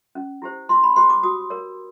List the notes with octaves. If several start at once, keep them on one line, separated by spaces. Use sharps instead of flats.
C#4
E4 G4 C5
E4 C6
B5
G4 C5 C6
D6
F#4 D#6
A#4 C#5